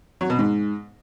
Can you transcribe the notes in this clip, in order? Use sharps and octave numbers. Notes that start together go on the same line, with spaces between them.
F#3
B2
G#2